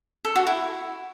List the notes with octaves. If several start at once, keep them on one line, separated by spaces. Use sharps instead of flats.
A4
F#4
E4